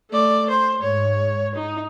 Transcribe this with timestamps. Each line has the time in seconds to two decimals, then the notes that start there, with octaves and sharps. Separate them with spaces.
0.11 A3 D5
0.50 C5
0.82 G#2 C#5
1.55 D#4